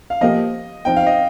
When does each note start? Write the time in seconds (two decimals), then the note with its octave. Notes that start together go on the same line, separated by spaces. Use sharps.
0.10 F5
0.21 F3 A#3 G4 D#5
0.85 F3 C4 D#4 G5
0.96 F5
1.06 D#5